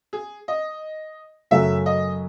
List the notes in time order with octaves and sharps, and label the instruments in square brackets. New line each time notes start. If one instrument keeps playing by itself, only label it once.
[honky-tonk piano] G#4
D#5
[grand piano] F#2 C#3 F#3 A3 C#4 [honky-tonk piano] E5
[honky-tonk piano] D#5